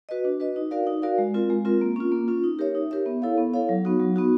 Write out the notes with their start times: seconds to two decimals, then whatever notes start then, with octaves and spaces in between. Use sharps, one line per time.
0.09 F#4 B4 D#5
0.25 D4
0.40 F#4 B4 D#5
0.56 D#4
0.71 F#4 A#4 D5 F5
0.87 D#4
1.02 F#4 A#4 D5 F5
1.18 G#3
1.34 C4 F4 A#4
1.50 G#3
1.65 C4 F4 A#4
1.81 A#3
1.96 C#4 F4
2.12 A#3
2.28 C#4 F4
2.44 D#4
2.59 G4 A#4 C#5 E5
2.75 D#4
2.91 G4 A#4 C#5 E5
3.06 B3
3.22 E4 A4 C#5 F5
3.37 B3
3.54 E4 A4 C#5 F5
3.69 F#3
3.85 B3 D#4 F#4
4.00 F#3
4.16 B3 D#4 F#4